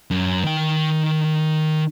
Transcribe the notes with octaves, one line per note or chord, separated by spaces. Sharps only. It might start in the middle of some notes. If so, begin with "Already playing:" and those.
F#2
D#3 G5